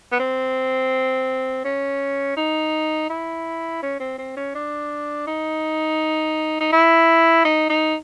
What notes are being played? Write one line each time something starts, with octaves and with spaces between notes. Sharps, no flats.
B3
C4
C#4
D#4
E4
C#4
C4
C4
C#4
D4
D#4
D#4
E4
D#4
D#4